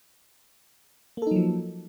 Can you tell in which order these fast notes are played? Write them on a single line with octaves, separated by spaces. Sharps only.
A#3 A4 D#4 F#3 F3